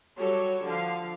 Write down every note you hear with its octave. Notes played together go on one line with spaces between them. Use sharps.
F#3 G3 F#4 G4 A4 C#5
D3 F3 F5